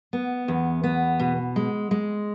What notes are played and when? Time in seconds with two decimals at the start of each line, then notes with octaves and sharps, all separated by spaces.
0.13 B3
0.48 E2
0.84 B3
1.20 B2
1.56 G#3
1.91 G#3